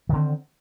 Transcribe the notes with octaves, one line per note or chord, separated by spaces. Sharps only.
D3 D#3 C4